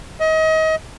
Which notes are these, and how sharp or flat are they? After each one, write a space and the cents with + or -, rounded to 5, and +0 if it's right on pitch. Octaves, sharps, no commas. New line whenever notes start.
D#5 +30